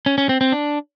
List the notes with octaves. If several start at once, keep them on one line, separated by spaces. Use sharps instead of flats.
C#4
C#4
C4
C4
D4